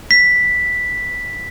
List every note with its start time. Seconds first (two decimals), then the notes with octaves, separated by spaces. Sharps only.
0.11 B6